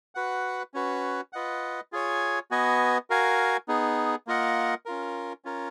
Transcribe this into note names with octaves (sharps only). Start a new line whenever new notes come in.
F#4 B4 F#5
C#4 F#4 B4
F4 B4 D#5 F#5
F4 G#4 C#5 G#5
B3 F#4 B4 D#5 G#5
F#4 A#4 F5 G#5
B3 D#4 G#4
A#3 F4 A#4 D#5 F#5
C#4 F4 A#4
C#4 F4 A#4